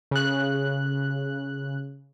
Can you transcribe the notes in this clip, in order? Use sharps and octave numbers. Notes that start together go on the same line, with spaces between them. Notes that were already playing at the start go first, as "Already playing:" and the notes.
C#3 F#6